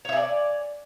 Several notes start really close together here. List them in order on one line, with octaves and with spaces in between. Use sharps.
C#5 E5 G#5 D5